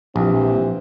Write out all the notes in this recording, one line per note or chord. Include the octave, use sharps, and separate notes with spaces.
A#1 E3 C4 G4